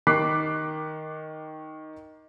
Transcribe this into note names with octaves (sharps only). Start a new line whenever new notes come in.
D#3 C#6 D6 F#6 B6 C7